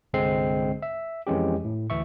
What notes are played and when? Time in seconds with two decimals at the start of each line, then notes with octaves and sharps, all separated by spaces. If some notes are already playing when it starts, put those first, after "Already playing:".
0.13 C2 G2 D3 G#3 C4 C7
0.82 E5
1.27 F2 E3 G#3 C#4 G4
1.64 A2
1.90 D2 E3 E5 C#6